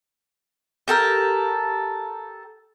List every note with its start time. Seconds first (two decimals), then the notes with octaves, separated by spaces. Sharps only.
0.88 G4 A4 A#4